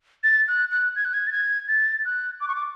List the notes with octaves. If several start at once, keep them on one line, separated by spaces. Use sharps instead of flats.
A6
F#6
F#6
G#6
F#6
G#6
A6
G#6
A6
F#6
D6
C#6
D6